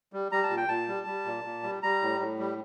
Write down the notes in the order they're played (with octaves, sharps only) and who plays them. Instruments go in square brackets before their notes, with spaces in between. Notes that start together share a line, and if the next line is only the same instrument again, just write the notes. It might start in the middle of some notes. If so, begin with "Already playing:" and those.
[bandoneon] G3
G3 A#5
A5
A#2
G5
A#2 A5
G3
G3
A#2
A#2
G3
G3 A#5
A2
A2
G3